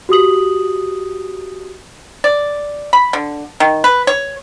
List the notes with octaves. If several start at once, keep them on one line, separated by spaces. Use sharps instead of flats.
F#4 G4 D#6 F#7
D5
B5
D3
D#3
B4
C#5